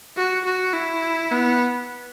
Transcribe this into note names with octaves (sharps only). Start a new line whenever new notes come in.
F#4
F#4
E4
B3